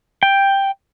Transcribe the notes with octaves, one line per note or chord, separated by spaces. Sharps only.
G5